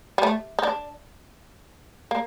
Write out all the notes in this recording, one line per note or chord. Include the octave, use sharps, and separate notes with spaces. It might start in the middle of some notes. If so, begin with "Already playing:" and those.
G3
A3
D#4
D4
A#3